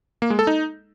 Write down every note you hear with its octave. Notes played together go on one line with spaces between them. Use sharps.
A#3
G#3
A4
D#4